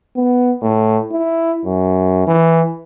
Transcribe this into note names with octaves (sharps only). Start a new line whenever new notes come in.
B3
A2
E4
F#2
E3